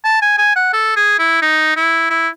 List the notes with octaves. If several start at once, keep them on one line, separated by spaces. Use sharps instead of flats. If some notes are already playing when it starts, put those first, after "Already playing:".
A5
G#5
G#5
F#5
A4
G#4
E4
D#4
E4
E4